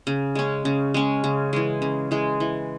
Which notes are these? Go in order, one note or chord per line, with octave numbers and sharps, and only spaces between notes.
C#3
G#3 C#4
C#3
G#3 C#4
C#3
E3 G#3
C#3
E3 G#3
E3